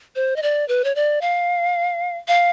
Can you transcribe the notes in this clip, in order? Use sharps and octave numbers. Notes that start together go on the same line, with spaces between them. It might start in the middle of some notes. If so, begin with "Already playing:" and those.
C5
D#5
D5
B4
C#5
D5
F5
F5